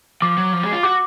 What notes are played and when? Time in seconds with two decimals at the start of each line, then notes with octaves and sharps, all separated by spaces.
0.22 F3 D6
0.38 F#3
0.53 F3
0.63 G#3
0.73 F4
0.83 F#4 D6